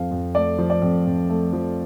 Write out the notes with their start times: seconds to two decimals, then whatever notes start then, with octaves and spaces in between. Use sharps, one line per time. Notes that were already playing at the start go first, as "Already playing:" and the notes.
Already playing: F2 F3 F5
0.11 F2
0.35 A3 D5
0.58 F3
0.70 D5
0.82 F2
1.06 F2
1.29 A3
1.53 F3